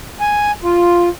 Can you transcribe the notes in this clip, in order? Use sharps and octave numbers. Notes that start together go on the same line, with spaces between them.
G#5
F4